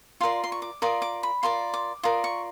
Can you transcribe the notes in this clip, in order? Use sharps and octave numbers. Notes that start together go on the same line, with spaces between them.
F4 A#4 D5 C6
C6
C#6
D6
F4 A#4 D5 D#6
D6
B5
F4 A#4 D5 C6
D6
F4 A#4 D5 D#6
C#6